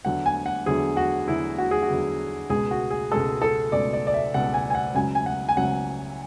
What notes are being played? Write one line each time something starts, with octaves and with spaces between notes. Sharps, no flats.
E2 D3 F#3 F#5
G#5
F#5
E2 D3 F#3 G#4
F#4
E2 D3 F#3 E4
F#4
G#4
F#4
E2 D3 F#3
C#2 B2 G#3 G#4
F#4
G#4
C#2 B2 G#3 A4
A4
C#2 B2 G#3 D5
D5
D5
E5
C#2 B2 G#3 F#5
G#5
G#5
F#5
C#2 C#3 F#3 G#5
G#5
F#5
G#5
C#2 C#3 F#3 F#5